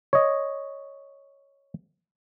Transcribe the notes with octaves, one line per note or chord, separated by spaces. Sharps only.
C#5 D#5